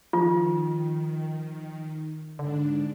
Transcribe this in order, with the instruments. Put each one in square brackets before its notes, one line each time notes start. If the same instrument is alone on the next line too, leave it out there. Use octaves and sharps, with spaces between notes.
[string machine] D#3 [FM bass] F3 [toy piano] F4
[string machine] G#2 D4 [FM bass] D3